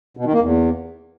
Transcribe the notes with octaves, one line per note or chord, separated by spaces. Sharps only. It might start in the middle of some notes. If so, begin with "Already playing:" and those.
B2
D#3
A#3
E2